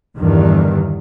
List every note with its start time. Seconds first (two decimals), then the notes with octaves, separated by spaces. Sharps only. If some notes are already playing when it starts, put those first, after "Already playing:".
0.18 E2 G2 D3 D#3